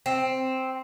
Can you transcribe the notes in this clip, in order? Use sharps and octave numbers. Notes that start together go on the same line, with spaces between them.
C4